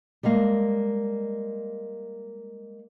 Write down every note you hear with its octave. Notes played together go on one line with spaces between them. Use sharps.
G3 G#3 A#3 F5